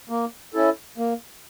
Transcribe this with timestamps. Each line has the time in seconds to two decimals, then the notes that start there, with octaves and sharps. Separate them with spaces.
0.10 A#3
0.54 C#4 E4 A4
0.98 A#3